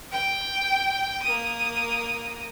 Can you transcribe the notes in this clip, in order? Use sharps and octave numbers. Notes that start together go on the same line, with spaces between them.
G5
A#3 D#6